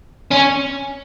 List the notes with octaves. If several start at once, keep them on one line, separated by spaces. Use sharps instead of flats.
C#4